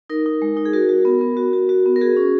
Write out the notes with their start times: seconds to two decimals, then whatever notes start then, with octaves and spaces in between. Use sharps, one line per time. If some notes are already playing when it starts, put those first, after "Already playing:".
0.10 D#4 A#4
0.26 D#4
0.42 G#3
0.57 D#4
0.65 G#4
0.73 F#4 A#4
0.89 F#4
1.05 B3
1.21 B3
1.37 F#4
1.53 F#4
1.69 F#4
1.86 B3
1.96 A#4
2.01 F#4 G#4
2.17 C#4